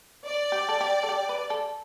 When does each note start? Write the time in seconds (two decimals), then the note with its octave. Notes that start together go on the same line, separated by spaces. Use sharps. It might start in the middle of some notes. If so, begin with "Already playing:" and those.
0.25 D5
0.52 G4
0.69 A4
0.81 G4
1.03 A4
1.09 G4
1.29 B4
1.50 A4